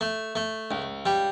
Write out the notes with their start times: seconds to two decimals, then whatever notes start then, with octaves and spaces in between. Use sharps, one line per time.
0.01 A3
0.36 A3
0.71 C#2
1.06 G3